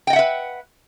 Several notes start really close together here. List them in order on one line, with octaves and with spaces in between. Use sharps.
G5 D#5 F#5 E5 B4